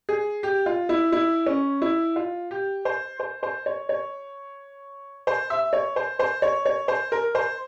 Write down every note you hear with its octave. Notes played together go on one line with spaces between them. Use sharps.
G#4
G4
F4
E4
E4
C#4
E4
F4
G4
C5
C5
C5
C#5
C#5
C5
E5
C#5
C5
C5
C#5
C#5
C5
A#4
C5